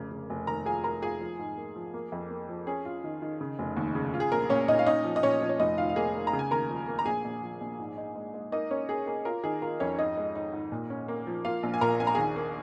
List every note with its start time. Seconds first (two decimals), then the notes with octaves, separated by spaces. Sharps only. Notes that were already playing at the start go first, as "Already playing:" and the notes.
Already playing: F1 C#3 A#3
0.12 C#3
0.30 F1
0.47 D#2 A#4 A#5
0.66 F4 G#4 G#5
0.84 F4 A#4 A#5
1.02 F4 G#4 G#5
1.20 F3
1.39 G#2
1.57 A#3
1.76 F3
1.94 A#3
2.12 F2
2.30 A#3
2.49 F3
2.67 C#4 G#4
2.85 F4
3.04 D#3
3.22 D#3
3.41 C#3
3.59 F1
3.77 D#2
3.95 C#3
4.14 F4
4.20 G#4
4.31 A#1 A#4
4.50 A#2 C#4 C#5
4.68 A#2 D#4 D#5
4.79 F5
4.86 C#4 D#4 D#5
5.04 F3
5.16 D#5
5.23 A#2 C#4 C#5
5.41 F3
5.49 C#5
5.59 F1 D#4 D#5
5.78 D#3 F4 F5
5.89 F5
5.96 A#3 G#4 G#5
6.14 A#3
6.27 A#5
6.33 C#3
6.39 G#5
6.51 D#2 A#4 A#5
6.70 F3
6.88 A#3
6.99 A#5
7.06 A#1 G#4 G#5
7.24 A#1
7.43 F3
7.61 A#1
7.79 G#2
7.97 D#4
8.16 G#3
8.34 G#3
8.52 A#3 D#4 D#5
8.71 A#3 C#4 C#5
8.89 A#3 G#4
9.07 A#3 G#4
9.25 F4 A#4
9.43 D#3 G#4
9.62 F4 A#4
9.80 F2 C#4 C#5
9.98 G#2 D#4 D#5
10.17 G#3
10.35 D#4
10.53 G#2
10.72 A#2
10.90 C#4
11.08 A#3
11.27 F3
11.45 A#3 F4 F5
11.63 A#1
11.74 G#5
11.81 A#2 A#4 A#5
11.99 A#1 G#5
12.07 A#5
12.15 D#2 G#4 G#5
12.36 A#3